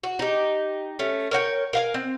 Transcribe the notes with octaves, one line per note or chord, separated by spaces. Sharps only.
F#4
D#4 G4
A3 C#4
A#4 C#5 F#5 G5
A#4 F5 G#5
C4